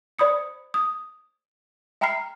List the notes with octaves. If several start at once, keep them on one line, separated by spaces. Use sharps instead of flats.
C5 D5 B5 D#6 C#7
D#6
E5 G5 A#5 B5 F6 C7